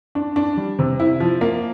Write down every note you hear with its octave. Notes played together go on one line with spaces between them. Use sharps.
D4
D4
G3
C3
E4
F3
A#3